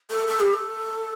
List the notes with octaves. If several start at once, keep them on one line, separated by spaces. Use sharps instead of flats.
A4
A4
G4
A4